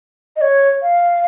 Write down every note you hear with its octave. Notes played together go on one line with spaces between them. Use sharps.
D#5
C#5
F5